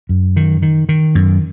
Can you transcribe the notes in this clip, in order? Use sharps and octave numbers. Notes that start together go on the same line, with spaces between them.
F#2
D#3
D#3
D#3
F#2